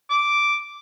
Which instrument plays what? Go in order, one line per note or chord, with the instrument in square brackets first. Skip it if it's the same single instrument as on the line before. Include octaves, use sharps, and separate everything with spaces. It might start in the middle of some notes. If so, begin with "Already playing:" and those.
[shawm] D6